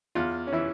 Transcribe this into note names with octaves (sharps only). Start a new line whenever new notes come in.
E2 F4
C#4
E3 E4